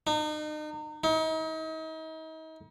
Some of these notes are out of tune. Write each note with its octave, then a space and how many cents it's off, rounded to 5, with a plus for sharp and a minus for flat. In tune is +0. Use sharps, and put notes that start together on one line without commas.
D#4 -35
D#4 +40